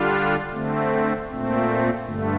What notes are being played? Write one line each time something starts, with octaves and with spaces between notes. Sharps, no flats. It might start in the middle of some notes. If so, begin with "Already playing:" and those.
Already playing: D3 G3 D4 F4
D3 A3 C4
A#2 A3 C4
G2 D3 A3